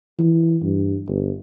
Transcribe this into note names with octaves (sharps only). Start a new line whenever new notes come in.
E3
G2
G1